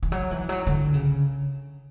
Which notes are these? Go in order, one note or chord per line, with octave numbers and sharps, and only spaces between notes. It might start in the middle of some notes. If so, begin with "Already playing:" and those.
E3
F#3
E3
F#3
D3
C#3